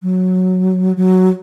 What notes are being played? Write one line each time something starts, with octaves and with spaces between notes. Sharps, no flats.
F#3
F#3